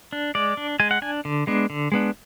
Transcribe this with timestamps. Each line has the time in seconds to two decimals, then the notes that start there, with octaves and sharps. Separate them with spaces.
0.13 D4
0.35 G#3 D5
0.57 D4
0.80 G#3 G#5
0.91 F#5
1.02 D4 G#5
1.25 D3
1.47 G#3 B3 D4
1.70 D3
1.92 G#3 B3 D4